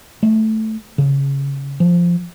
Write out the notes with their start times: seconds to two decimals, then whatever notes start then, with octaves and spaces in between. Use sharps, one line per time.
0.23 A3
0.98 C#3
1.80 F3